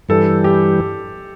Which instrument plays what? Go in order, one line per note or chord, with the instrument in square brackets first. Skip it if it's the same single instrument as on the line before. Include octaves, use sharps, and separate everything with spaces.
[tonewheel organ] G2 E3 G3 [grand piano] A4
[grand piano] G4